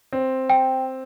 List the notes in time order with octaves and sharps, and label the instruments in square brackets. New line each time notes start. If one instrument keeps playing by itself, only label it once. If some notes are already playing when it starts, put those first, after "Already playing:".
[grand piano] C4
[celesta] G5